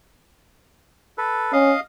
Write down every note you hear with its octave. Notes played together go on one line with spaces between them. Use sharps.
A4 B4
C#4 D#5 F5